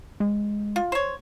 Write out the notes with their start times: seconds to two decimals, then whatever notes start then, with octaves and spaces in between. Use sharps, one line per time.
0.20 G#3
0.76 F4
0.92 C5 C#5